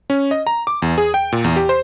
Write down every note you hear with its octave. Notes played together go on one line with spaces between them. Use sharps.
C#4
D#5
A#5
D6
E2
G#4
G5
A#2
E2
G4
C5